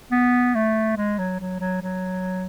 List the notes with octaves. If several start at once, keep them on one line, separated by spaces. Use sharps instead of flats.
B3
A3
G#3
F#3
F#3
F#3
F#3